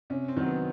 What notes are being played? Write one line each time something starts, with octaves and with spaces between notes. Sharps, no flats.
C3 C#4
C4
D#3 F#3
B3